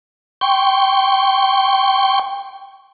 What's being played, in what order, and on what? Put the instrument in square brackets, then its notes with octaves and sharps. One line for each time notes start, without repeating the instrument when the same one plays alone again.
[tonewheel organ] G5 C6 C#6